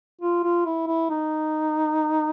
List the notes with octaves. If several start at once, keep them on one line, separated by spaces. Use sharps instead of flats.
F4
F4
E4
E4
D#4